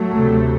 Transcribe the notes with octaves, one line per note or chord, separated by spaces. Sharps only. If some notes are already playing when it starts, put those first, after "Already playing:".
Already playing: F#3 A3
D2 C3